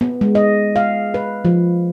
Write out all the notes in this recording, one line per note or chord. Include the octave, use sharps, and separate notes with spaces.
B3
G#3
D#5
F5
B4
F3